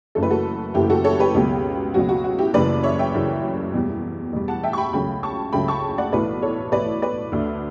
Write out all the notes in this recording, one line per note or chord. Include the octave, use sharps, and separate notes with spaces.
F#1 F#2 E3 A3 A4
B4
F#4 A4
F#1 F#2 E3 A3 E4 G4
F#4 A4
A4 C#5
G4 B4
C#2 B2 F#3
C#2 B2 F#3 F#4
F#4
F#4
E4 G4
F#1 F#2 C#3 E3 B4 D5
C#5 E5
E5 G5
F#1 F#2 C#3 E3
E2 B2 G3
E2 B2 G3
F#5 A5
E5 G5
C#6
G5 B5
C#2 C#3 F#3 A3 G5 B5
A5 C#6
C#2 C#3 F#3 A3 G5 B5
A5 C#6
D5 F#5
B1 A2 E3 A3 B4 D5
A4 C#5
B1 A2 E3 A3 B4 D5
B4 D5
D2 D3 A3